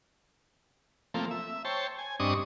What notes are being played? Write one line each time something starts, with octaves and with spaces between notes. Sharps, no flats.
F3 A3 A#3 C4
E5
C5 C#5 G5 A5
G#5
G2 C4 D4 D#5 C#6 D#6